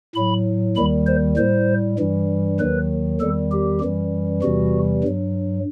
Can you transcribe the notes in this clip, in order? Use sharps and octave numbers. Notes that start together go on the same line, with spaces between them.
A2 F#3 B5
D#2 D#3 G3 B5
C5
A2 G3 C5
G2 E3 G3
D#2 D#3 F#3 B4
E2 D#3 G3 A4
G4
F#2 E3 G3
E2 C3 E3 G3 F#4
G2 F#3